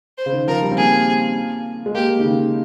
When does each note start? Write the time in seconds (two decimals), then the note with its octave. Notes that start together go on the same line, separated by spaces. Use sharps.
0.18 C5
0.26 C#3
0.32 D#3
0.48 F3 A#4
0.62 G3
0.72 C4
0.77 A#3 G#4
1.86 G#3
1.95 A#3 G4
2.19 D#3
2.23 C#3